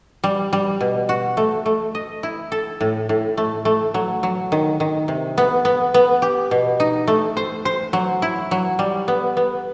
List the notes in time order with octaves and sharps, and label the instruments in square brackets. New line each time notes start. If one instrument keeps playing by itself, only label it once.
[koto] G3
G3
B2
F#4
A3
A3
D#5
E4
A4
A2
A2
A3
A3
F#3
F#3
D#3
D#3
C3
B3
B3
B3
G4
B2
D#4
A3
C5
C5
F#3
E4
F#3
G3
B3
B3